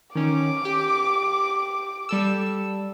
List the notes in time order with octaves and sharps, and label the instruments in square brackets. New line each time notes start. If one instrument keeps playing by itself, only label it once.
[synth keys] D#3 C#4 [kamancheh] D6
[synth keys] G4
G3 A4 E6